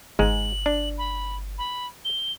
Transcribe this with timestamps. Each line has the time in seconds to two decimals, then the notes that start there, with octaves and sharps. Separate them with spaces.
0.19 G1 G#2 G#3 F#7
0.66 D4
0.97 B5
1.58 B5
2.04 G7